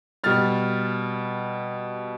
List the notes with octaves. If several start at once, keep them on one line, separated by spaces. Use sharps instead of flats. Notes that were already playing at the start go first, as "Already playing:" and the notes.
B2 G3 F6 A6